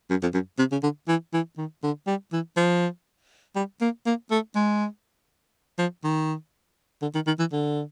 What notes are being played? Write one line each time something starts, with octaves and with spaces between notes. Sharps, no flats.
F#2
F2
F#2
C3
C#3
D3
E3
E3
D#3
D3
G3
E3
F3
G3
A#3
A#3
A3
G#3
F3
D#3
D3
D#3
D#3
E3
D3